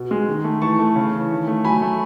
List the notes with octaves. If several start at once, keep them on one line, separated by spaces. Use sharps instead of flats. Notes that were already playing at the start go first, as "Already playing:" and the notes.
Already playing: B2
G#3
D#3
A3
E3 A5 C#6
A3
C#3
E3
D#3
A3
F#3 G#5 B5
A3